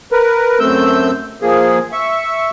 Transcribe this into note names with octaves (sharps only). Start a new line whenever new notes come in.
A#4 B4
F#2 A3 C4 E6 G6
F3 A#3 G#4
E5 C#6